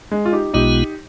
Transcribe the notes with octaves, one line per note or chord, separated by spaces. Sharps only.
G#3
F4
D#4 G4
B1 B2 G#3 B3 D#4 F4 G4